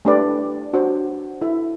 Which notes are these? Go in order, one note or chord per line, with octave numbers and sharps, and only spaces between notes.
A3 D4 G4 B4 D5
D4 F#4 C5
E4 A4 E5